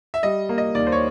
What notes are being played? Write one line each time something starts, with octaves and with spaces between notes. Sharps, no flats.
E5
G3 D#5
A#3
D#5
D#2 D5
C5
C#5